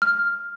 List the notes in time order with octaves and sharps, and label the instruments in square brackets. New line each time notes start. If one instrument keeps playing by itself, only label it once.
[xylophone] F6